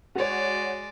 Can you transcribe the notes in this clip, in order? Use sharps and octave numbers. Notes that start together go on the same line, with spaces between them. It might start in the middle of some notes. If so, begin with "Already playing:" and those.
G#3 F#4 C#5 D5